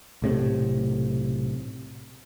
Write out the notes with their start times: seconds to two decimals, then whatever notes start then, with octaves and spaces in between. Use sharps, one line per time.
0.22 B1 A2 C3